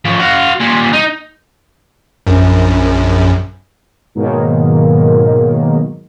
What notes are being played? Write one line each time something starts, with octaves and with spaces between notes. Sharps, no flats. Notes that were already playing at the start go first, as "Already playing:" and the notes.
F3 C#4
F#4 F5
A#2 G3
D#4
A#1 F#2
G#2 B2 D#3 F#3 A#3